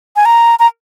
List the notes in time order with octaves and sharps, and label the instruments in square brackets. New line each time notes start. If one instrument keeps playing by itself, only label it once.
[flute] G#5
A#5
A#5